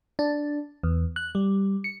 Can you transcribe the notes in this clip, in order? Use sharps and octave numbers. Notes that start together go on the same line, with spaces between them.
D4
E2
F#6
G3
C#7